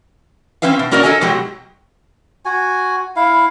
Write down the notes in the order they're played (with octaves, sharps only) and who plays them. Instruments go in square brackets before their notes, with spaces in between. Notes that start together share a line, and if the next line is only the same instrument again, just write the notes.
[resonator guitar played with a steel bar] C4 C#4 B4 E5 F5
B2
A#3 C#4 F#4 A#4 D5 D#5
A4 A#4 D#5 E5 G#5
B2 F#3 G#3 F#4 G4
[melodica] F#4 G#5
E4 F5